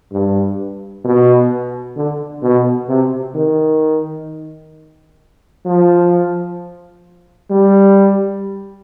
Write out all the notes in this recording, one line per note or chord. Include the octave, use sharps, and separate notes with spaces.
G2
B2
D3
B2
C3
D#3
F3
G3